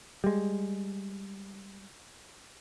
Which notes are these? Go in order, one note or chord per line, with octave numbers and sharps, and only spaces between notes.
G3 G#3